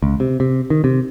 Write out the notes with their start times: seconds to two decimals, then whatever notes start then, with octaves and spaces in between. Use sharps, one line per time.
0.03 C#2
0.20 C3
0.40 C3
0.70 D#3
0.84 C3